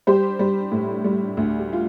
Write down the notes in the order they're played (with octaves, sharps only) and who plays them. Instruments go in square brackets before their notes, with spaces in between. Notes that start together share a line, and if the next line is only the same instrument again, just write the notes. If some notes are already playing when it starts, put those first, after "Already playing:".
[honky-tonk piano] G3 G4 C5
G3
A2
G3
D2
G4
F4